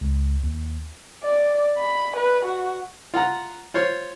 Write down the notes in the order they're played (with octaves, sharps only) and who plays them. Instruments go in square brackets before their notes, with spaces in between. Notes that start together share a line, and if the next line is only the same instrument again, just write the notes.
[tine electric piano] C#2
D#2
[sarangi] D5
B5
B4
F#4
[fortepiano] F4 F#5 A#5
F4 C5 C#5